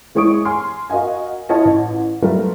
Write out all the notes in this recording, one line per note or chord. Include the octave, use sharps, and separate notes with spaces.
E3 G#3 C#5 C#6 D#6 D7
G#5 C6 F6
F#4 A#4 D#5 F5 G#5
E4 F4 C#5 D#5 A5
A1
F#3 G3 A3 F4 A#4 B4